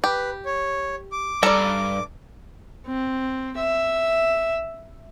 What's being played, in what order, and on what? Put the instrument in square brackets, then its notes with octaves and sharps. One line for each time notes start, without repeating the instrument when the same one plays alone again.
[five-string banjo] G4 [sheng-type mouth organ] B4
[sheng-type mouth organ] C#5
D6
[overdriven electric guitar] G2 [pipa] A4 D5 [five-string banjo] A#5
[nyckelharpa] C4
E5